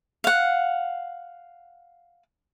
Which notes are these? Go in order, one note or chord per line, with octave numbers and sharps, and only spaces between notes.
F5 F#5